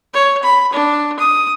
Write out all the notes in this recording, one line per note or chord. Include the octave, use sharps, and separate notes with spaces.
C#5
B5
D4
D#6